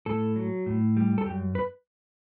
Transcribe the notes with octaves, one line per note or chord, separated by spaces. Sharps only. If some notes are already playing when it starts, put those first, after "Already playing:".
A2 A4
F#3
A2
G3
A4
F#2 G4
B4